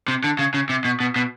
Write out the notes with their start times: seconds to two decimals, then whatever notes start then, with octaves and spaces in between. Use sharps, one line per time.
0.08 C3
0.24 D3
0.39 C#3
0.54 C#3
0.70 C3
0.85 B2
1.00 B2
1.16 B2